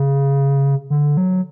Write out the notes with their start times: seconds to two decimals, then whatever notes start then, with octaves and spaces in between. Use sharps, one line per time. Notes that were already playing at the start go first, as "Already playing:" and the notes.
Already playing: C#3
0.90 D3
1.17 F#3